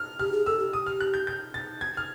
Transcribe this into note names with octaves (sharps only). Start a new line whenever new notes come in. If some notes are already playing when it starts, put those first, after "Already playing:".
Already playing: F6
G4 F6
G#4
A4 E6
G4
D#6
F6
F#6
G6
G6
A6
G#6
F6